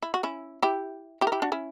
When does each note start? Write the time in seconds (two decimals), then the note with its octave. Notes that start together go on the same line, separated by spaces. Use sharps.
0.02 E4
0.14 F#4
0.23 C#4 E4
0.62 E4 G4
1.21 E4 G4
1.27 A#4
1.32 E4 G4
1.42 D4 F#4
1.52 C#4 E4